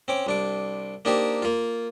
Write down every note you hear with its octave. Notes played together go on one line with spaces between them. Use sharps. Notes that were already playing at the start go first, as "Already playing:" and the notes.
C4 C#4 D6
C2 D4 D6
A#3 D4 D#4 G4 C5
A#3 F4